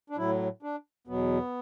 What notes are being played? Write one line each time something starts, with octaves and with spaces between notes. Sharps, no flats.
D4
A2 F#3 E4
D4
E2 B2 F#3 B3